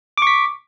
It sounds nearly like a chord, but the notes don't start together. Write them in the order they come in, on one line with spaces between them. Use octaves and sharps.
D6 C#6 B6